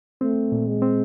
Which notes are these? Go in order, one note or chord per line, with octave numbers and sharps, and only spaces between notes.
A3 C4
A#2
G#3
C4